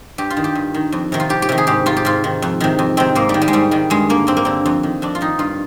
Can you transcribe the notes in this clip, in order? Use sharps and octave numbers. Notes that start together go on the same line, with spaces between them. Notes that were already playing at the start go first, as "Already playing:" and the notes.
G2 G4
F4
D#3
G4
G2
D#3
F2
C3 D#3
F4
F2 G4
G4
C3 D#3
G#4
G#2 G4
D#3 F4
G4
G#2 F4
D#3
F2
C3 D#3
F2
C3 D#3 C4
G#2 A#3
G3
D#3
G3
G#3
G#2 G3
D#3 G3
G2 G#3
D3 A#3
G2 C4
A#3
D3 C4
F2
D#3
F2 D4
F4
D#3 D#4
G2 F4